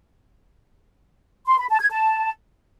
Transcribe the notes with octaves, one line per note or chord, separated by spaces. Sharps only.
C6
B5
A5
G#6
A5